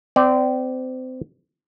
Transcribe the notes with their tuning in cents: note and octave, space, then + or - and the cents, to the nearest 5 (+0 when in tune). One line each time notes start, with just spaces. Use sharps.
C4 -30 D5 +0